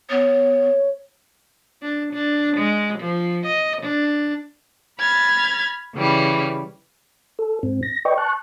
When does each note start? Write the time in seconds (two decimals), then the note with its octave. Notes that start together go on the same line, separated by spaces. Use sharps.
0.10 B3 C#5
1.82 D4
2.13 D4
2.57 G#3
2.99 F3
3.46 D#5
3.82 D4
4.99 B5 F6 G#6 A6
5.95 C#3 E3 G3 B4
7.39 A4
7.63 G#2 C4
7.83 A#6
8.05 B4 D5 D#5 G5 C#6
8.18 A5 C#6 F#6